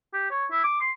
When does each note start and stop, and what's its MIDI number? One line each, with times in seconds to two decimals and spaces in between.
0.13 0.26 67
0.31 0.46 73
0.51 0.63 64
0.64 0.76 86
0.81 0.91 84